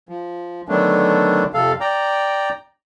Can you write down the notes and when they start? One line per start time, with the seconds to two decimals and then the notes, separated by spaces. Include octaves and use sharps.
0.09 F3
0.69 D3 D#3 F#3 A3 B3 D4
1.54 F2 C3 A4 F5
1.80 D5 G5 A#5